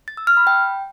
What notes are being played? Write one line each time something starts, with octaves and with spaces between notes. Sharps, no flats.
A6
E6
F6
B5
G5